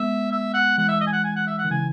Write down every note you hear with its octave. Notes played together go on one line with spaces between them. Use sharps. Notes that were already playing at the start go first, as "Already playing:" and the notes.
Already playing: G#3 B3 E5
E5
F#5
E3 G#3 F#5
E5
D#5
G#5
F#5
G#5
F#5
E5
F#5
D#3
C#3 E3 G#5